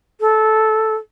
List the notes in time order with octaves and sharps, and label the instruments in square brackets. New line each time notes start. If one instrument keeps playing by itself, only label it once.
[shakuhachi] A4